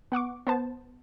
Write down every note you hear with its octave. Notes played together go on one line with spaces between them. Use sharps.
B3 F#5 C#6 D6
B3 C5 A5